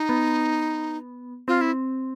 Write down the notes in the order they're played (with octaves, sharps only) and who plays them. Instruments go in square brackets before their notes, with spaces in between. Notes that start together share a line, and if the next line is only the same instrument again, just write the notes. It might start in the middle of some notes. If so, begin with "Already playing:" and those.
Already playing: [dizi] D#4
[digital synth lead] B3
[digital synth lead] C4 [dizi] F4
[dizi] E4